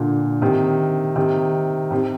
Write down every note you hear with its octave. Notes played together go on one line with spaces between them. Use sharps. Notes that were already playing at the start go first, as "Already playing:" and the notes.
Already playing: A#2 D3
C3 D#3
C3 D#3
C3 D#3